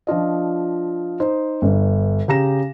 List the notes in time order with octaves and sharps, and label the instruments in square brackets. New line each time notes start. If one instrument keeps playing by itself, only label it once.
[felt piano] F3 D4 F4 D#5
D#4 C5
G1 G2
C#3 G4 A#5 A#6 E7